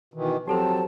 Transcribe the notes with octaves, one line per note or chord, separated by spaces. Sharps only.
B2 D#3 E3
F3 F#3 C4 G4 A4 C5 A5